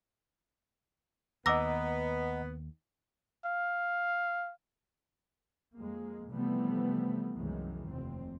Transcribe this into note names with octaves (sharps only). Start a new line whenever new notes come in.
D#2 B3 D#5 F#5 A#5 D6 E6 A#6
F5
F2 G#3 A#3
C3 E3 F3 G3 A3 B3
C2 F#2 D#3 E3 G#3
F1 D#2 C4